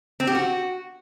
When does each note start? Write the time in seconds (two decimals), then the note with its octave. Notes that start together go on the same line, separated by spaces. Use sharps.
0.20 C4
0.27 G4
0.35 F#4